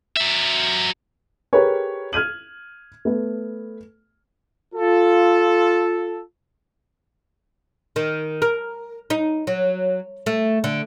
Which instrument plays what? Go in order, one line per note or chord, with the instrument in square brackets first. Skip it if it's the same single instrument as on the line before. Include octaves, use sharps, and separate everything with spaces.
[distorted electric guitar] F#3 E5
[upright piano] G4 G#4 A#4 B4 C#5
F6 G#6 D#7 F#7
A3 B3
[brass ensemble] F4 A4
[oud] D#3
A#4
D#4
F#3
A3
D3